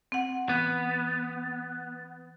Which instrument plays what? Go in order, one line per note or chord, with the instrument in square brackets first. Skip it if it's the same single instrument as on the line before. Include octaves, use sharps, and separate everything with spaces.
[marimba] C4 F#5
[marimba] E3 [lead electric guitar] B3